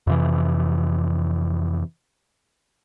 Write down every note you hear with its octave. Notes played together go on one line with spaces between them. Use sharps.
F2 C3 E3